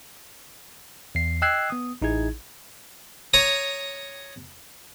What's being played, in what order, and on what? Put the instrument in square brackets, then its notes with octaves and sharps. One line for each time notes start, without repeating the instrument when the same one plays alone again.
[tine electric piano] E2 C7
D#5 G5 E6 F#6 G#6 C7
B3 D#6
A1 D#4 E4 G#4 G#6
[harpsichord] C#5 A#5 D#6